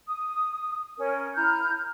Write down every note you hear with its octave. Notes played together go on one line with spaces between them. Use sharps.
D#6
C#4 A#4
E4 A#5 F6 G6